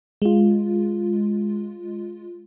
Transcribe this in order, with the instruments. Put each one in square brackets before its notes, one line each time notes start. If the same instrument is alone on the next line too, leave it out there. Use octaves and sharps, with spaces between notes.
[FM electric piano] G#3 F4